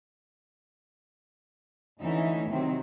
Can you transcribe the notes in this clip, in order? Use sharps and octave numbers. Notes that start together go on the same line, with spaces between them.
D2 E3 C#4 D#4 E5
C3 D#3 F#3 C4